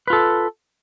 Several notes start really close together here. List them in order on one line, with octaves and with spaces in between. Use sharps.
B4 F4 A4